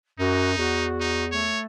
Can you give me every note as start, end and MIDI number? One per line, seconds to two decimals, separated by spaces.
0.20 0.55 42
0.20 0.86 63
0.20 0.51 66
0.57 1.52 40
0.57 1.25 66
1.00 1.26 63
1.32 1.65 57
1.32 1.60 73